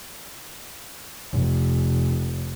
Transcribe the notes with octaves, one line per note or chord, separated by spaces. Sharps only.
F1